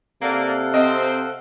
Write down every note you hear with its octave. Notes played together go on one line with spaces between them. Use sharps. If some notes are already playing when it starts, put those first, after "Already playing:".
C3 A#3 A4 D5 F5 F#5
C4 D#5